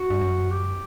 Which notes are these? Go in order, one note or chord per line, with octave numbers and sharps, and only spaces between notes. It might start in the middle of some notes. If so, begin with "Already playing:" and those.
Already playing: F#4
G2
F#2
G4